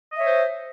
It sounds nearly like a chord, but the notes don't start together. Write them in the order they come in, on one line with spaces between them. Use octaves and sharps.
D#5 E5 C#5 C5